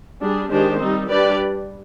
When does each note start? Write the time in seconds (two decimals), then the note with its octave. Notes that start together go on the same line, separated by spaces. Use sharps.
0.20 G3 D4 G#4
0.50 D#3 G#3 D4 G4 C5
0.80 G3 C4 D#4
1.09 G3 D4 G4 B4 D5